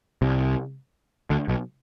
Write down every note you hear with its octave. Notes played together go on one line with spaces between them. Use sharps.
C2 C3
D2 D3
B1 B2